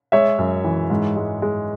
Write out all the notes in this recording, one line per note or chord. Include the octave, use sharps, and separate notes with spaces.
G#3 C#5 E5
F#2
E3
G#2
G#3
G#3